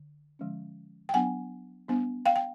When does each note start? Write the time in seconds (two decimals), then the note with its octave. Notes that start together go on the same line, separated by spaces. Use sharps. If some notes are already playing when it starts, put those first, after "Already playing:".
Already playing: D3
0.39 D3 F3 G#3 C#4
1.09 G5
1.14 F#3 B3 D4 F#5 G#5
1.88 G3 B3 D4
2.26 F5 G5
2.36 G5